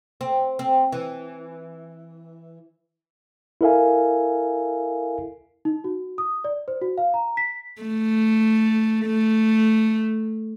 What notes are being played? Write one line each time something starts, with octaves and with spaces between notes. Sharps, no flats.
C4
C4
E3
E4 A4 A#4 E5 F5 G#5
D#4
F#4
D#6
D5
C5
F#4
F5
A#5
B6
A3
A3